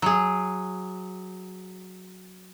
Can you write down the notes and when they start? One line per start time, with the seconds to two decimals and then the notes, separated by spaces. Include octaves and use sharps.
0.02 F#3 G#4